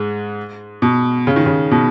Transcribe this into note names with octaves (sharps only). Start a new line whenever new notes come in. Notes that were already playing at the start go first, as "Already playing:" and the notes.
Already playing: G#2 G#3
B2
C#3
D#3
C#3
B2